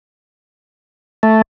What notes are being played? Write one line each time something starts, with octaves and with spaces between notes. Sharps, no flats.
A3